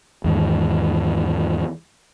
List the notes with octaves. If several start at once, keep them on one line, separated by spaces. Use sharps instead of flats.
E2 G#2 D#3